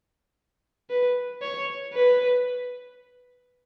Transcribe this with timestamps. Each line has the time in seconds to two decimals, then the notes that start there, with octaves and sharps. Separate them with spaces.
0.90 B4
1.42 C#5
1.94 B4